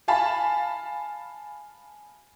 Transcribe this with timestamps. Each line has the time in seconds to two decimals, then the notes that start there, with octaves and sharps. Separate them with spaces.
0.08 F5 G#5 A5 B5